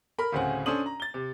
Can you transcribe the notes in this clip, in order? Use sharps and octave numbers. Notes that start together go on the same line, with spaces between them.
A#4 B5
D2 A2 C#3 C4 F#5 G#5
C#4 D4 A4 C5 D#6 F#7
A#5
A6 G7
C3